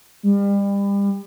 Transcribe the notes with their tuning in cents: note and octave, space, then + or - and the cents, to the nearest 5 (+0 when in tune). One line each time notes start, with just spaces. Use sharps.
G3 +35